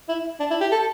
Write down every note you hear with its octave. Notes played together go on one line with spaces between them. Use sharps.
E4
D4
E4
G4
A4